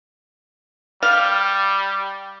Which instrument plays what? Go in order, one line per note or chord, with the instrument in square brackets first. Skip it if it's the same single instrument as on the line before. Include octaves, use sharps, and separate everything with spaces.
[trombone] G3 [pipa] F5